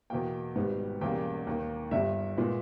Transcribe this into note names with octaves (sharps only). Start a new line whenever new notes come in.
E2 B2 A#3 G5
G#1 G#2 G3 B3
E1 E2 C#3 G3 A#3 G5
D#2 D#3 A#3
G1 G2 G3 E5
A#2 G#3 B3